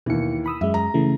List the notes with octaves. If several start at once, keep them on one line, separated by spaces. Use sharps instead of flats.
D#2 B2 E3 C#7
B5 D#6 E6
F#2 G#3 E5
A#5
C#3 E3 A3